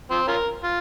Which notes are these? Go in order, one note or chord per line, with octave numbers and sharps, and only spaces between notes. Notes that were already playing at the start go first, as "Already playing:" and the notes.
F3 C4
C#4 F4 A#4
F4